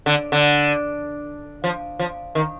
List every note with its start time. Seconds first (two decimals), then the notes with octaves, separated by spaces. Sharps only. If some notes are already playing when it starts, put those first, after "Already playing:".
0.06 D3
0.32 D3
1.64 F3
1.99 F3
2.35 D#3